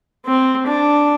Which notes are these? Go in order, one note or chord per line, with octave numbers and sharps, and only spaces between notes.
C4
D4